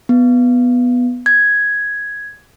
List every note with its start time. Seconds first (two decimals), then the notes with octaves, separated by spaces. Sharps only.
0.09 B3
1.26 G#6